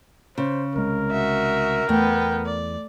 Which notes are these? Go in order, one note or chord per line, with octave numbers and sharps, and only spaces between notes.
C#3 C5
C2 G#3 A#4
F#4 E5
E2 A3 B3 G5
D5